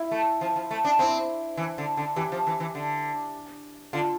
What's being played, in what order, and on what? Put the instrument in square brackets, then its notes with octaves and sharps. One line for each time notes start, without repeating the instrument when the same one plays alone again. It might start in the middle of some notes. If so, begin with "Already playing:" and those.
Already playing: [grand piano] E4
[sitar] A3
F3
F3
A3
D4
[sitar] C4 [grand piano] E4
[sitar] E3
D3
D3
[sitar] E3 [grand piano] G4
[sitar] F3
E3
E3
D3
[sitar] D3 [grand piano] F4